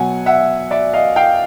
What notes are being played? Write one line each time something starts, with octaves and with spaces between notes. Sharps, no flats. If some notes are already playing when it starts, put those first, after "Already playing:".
Already playing: B2 F#3 F#5 G#5
E5 F#5
D5 E5
D#5 F5
F5 G5